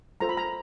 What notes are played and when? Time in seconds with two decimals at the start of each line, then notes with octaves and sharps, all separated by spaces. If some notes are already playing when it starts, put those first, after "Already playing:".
0.20 F4 A4 C5 A#5
0.29 B5
0.37 A#5